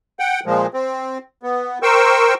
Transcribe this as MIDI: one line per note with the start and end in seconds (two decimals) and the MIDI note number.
0.19 0.40 78
0.19 0.40 79
0.46 0.66 46
0.46 0.66 53
0.46 0.66 56
0.74 1.18 60
1.43 1.79 59
1.82 2.34 70
1.82 2.34 72
1.82 2.34 79
1.82 2.34 85
1.82 2.34 88